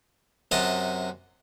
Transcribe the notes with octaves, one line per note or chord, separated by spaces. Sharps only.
F#2 C3 D#5 F#5 A5